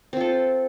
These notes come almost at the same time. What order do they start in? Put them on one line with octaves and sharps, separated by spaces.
C4 F4 A4